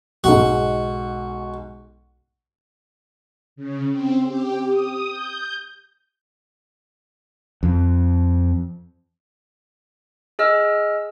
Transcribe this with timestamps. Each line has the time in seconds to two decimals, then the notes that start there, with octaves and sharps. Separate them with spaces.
0.24 B1 G#2 F#4
3.56 C#3
3.90 C4
4.25 G4
4.69 D#6
5.10 G6
7.63 F2
10.39 G#4 D#5 E6 F6